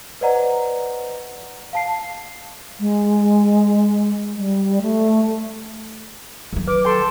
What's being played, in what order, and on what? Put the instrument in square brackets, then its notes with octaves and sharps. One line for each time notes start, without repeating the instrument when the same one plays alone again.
[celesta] B4 C5 D5 D#5 F#5 A#5
F5 A5 C7
[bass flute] G#3
G3
A3
[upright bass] D#3 F#3
[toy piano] B4 [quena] D6
[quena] A4 [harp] G5 C6